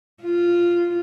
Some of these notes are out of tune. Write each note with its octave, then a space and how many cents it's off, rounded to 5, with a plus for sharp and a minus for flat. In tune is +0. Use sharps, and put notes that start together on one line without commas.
F4 -10